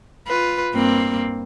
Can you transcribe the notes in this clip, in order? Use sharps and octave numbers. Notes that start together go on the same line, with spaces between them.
F4 B4
G2 A#3 C4